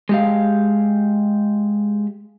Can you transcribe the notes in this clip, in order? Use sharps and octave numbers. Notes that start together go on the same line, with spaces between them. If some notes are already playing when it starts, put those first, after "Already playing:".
G#3 G4 F5